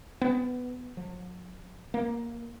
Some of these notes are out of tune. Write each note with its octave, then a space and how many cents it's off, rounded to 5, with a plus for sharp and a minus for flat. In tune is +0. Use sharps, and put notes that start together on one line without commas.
B3 +15
F#3 -45
A#3 +10